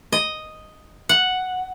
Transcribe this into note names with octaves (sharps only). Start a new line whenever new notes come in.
D#5
F#5